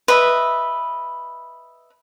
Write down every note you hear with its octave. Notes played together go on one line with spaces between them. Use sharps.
B4 D#5 E5